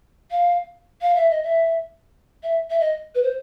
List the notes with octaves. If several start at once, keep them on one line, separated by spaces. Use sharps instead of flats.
F5
F5
E5
D#5
E5
E5
E5
D#5
B4
C5